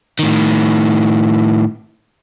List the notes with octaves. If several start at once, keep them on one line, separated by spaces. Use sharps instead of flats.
A2 D#3